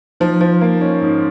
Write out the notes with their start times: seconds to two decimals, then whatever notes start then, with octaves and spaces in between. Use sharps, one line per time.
0.20 F3 D#4
0.41 F3
0.61 A#3
0.81 C#4 D#4
1.02 G#2